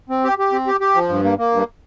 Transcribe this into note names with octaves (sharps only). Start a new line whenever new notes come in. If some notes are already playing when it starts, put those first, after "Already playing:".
C4
G4
G4
C4
G4
G4
F3
G2
A#3
A#3
G2